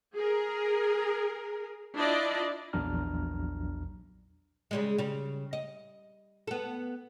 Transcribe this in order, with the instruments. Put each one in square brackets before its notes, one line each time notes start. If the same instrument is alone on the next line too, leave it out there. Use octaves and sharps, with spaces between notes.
[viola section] G#4 A#4
D4 E4 F4 D5 D#5
[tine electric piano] A#1 E2 F#3 D4 A#5 F6
[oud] C#3 G3 G#3
C#3 G3
D#5
B3 A4